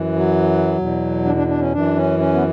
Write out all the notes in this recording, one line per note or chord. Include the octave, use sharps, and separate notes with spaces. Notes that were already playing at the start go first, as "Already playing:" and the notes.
Already playing: F#2 E3
F#3
E2 B2
D4
D4
D4
C#4
F#2 E3 D4
C#4
C#4
B3